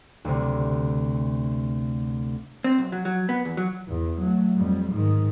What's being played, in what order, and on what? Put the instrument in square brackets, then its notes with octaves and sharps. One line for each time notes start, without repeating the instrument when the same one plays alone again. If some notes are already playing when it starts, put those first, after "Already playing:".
[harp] D2 C3
[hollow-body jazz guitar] C4
B1
F#3
F#3
B3
E2
F#3
[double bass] E2
F#3 A3
F2 G3
G#2 D#3